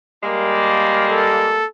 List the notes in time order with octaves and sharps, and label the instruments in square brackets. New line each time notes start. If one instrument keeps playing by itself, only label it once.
[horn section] G3 G#3 A#3
[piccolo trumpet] A4